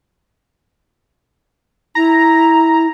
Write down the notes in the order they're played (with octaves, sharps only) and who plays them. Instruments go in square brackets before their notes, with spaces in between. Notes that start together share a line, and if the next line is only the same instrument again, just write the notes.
[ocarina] E4 [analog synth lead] A#5